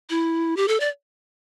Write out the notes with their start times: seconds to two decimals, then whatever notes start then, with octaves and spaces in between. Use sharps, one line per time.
0.10 E4
0.57 G4
0.68 A4
0.80 D5